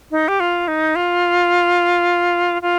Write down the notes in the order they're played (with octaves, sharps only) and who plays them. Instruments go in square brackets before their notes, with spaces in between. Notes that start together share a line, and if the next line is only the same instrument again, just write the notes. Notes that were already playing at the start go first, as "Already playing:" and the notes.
[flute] D#4
G4
F4
D#4
F4
F4